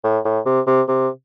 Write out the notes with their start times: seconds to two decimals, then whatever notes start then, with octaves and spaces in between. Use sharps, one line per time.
0.04 A2
0.25 A2
0.45 C3
0.67 C3
0.88 C3